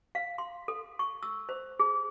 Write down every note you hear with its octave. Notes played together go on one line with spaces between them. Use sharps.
F5
C6
A4
C#6
E6
C5
G#4